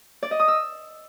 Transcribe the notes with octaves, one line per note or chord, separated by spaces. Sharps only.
D5
D#5
D#6
E6